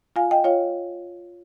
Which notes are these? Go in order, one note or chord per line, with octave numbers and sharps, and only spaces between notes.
F4 F5 G#5
D#5 G5
F4 C#5 F5